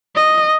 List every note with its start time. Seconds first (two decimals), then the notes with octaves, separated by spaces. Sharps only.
0.16 D#5